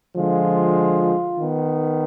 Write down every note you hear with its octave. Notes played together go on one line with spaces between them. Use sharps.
D3 F3 G#3 F4
D#3 B3